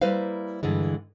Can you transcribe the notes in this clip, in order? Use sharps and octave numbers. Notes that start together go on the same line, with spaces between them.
G3 A#3 E4 B4 C5 F5
G2 D3 E3 G#3